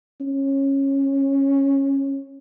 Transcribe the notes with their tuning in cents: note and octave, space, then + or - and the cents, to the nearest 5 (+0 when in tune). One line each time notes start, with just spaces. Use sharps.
C#4 -15